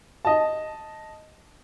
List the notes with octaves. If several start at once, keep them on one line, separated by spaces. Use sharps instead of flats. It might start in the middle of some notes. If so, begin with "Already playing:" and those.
D#5 A5